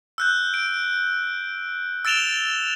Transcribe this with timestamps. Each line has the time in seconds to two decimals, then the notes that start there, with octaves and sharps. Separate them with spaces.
0.18 E6 F#6 G6
0.54 D7
2.05 E6 A6 D7 E7 F7 G7